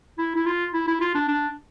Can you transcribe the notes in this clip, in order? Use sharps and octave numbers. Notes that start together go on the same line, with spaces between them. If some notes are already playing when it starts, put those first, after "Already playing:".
E4
E4
F4
E4
E4
F4
D4
D4